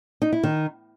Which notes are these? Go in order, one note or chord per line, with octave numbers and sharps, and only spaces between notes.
D#4
E4
D#3